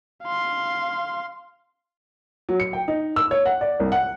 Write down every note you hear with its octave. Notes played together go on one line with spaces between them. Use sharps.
F5 C6
F#3
C#7
G5
D#4
E6
C#5
F#5
D5
C2
F#5